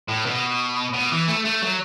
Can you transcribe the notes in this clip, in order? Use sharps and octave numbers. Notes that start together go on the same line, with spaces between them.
A2
B2
B2
E3
A3
A3
F#3